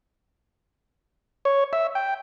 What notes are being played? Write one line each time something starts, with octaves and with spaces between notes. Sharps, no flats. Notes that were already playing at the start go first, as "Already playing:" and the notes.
C#5
E5
G5